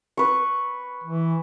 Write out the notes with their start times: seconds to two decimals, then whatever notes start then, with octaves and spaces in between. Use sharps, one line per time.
0.17 B4 C#6
1.03 E3